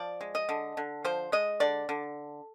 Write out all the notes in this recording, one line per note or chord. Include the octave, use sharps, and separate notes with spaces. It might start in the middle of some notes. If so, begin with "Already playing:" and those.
Already playing: F3 D5
G#3
D#5
D3
D3
F3 C5
G#3 D#5
D3 D5
D3